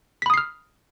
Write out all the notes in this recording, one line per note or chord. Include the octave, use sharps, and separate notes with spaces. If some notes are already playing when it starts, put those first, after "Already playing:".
B5 D#6 F6 B6 C7